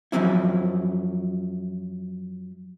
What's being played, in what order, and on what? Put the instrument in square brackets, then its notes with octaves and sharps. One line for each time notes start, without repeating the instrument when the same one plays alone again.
[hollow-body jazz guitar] F#2 F3 F#3 C4 E4